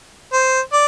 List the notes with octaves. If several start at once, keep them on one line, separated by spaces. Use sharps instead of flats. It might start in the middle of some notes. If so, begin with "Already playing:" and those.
C5
D5